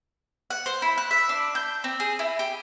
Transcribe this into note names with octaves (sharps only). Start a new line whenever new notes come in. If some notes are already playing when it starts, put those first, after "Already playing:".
F#5
C5
E4
F#6
E5
D4
G6
C4
G#4
E4
G4